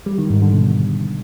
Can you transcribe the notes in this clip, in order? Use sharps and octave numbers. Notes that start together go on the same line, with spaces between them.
G3
D#3
G#2
D3
B2